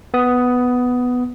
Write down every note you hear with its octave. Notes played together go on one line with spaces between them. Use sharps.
B3 D#6